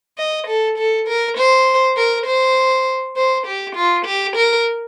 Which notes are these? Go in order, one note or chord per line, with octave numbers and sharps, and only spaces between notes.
D#5
A4
A4
A#4
C5
A#4
C5
C5
G4
F4
G4
A#4